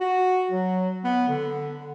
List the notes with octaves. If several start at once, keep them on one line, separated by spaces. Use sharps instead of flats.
F#4
F#3
B3
D3